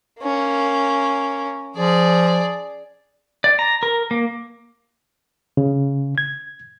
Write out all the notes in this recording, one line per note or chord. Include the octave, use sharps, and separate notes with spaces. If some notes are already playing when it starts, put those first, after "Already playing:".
A#3 C#4
F3 G#4 D5
D5
A#5
A#4
A#3
C#3
G#6